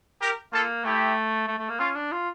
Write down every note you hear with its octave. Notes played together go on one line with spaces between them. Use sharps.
G4 A#4
A#3 F4 A4
A3 E4 G4
A3
A3
A#3
C#4 F4
D4
F4